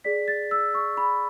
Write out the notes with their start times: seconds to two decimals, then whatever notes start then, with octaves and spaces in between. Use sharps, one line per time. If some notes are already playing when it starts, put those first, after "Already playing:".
0.04 G#4 D5 B6
0.28 A6
0.51 E6
0.74 C#6
0.97 B5